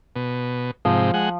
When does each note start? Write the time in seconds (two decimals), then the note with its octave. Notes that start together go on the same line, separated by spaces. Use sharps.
0.16 B2
0.85 G#2 C3 F3
1.14 G#3 F#5